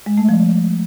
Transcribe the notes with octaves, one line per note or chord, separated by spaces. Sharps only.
G#3
A3
F3